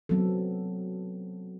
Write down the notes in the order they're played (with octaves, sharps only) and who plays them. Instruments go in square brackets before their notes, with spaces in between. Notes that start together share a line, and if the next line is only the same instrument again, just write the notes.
[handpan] F#3 B3 C4 A4